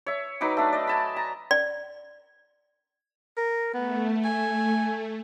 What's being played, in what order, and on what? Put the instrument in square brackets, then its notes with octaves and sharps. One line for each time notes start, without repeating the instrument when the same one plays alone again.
[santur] C#5 E5
F#3 D#4 B4 D6
A3 D4
D5 D#5
G#5 A5 B5
A#5
[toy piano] D5
[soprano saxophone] A#4
[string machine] A3 [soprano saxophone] B3
[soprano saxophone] G#5